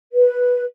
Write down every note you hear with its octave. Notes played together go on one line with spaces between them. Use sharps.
B4